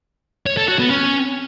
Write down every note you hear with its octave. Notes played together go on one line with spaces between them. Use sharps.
C#5
A4
F#4
B3
C#4